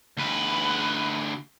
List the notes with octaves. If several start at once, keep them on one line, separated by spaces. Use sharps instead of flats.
D2 B4